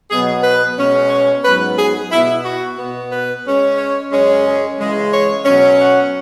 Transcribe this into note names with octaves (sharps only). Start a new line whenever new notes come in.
B2 F#3 B3 G#4
B4
B2 G#3 C#4
C#5
G#2 F#3 B3 B4
G#4
B2 B3 E4
F#4
B2 B3
B4
C#3 G#3 C#4
C#5
F#2 C#3 G#3 C#4
G#4
C#3 E3 G#3
C#5
B2 F#3 C#4
F#5